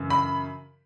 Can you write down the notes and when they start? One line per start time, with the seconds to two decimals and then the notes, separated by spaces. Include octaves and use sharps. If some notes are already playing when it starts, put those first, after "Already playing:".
Already playing: F#2 C#3 E3
0.10 B5